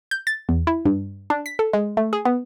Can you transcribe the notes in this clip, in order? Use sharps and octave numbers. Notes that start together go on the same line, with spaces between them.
G6
A6
E2
E4
G2
D4
B6
A4
G#3
A3
G#4
B3